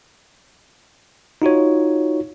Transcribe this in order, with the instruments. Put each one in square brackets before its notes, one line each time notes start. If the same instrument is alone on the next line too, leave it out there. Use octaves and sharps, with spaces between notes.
[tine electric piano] D#4 F4 F#4 C#5